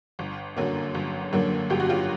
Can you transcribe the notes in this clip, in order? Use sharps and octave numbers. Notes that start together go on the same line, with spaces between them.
G1
F#2 D3 F#3 A#3
G1
F#2 D3 F#3 A#3
G1 G4
F#4
F4 G4